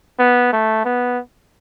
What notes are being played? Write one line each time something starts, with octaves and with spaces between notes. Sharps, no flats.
B3
A3
B3